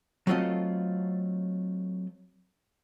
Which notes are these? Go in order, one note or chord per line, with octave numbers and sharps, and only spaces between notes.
F#3 A3 C4 F4 A4 D#5